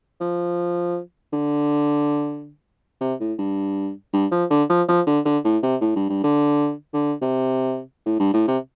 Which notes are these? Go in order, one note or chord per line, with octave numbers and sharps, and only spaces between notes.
F3
D3
C3
A2
G2
G2
F3
D3
F3
F3
D3
D3
A2
C3
A2
G2
G2
D3
D3
C3
A2
G2
A2
C3